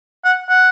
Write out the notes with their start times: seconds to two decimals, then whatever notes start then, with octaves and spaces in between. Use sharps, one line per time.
0.24 F#5
0.49 F#5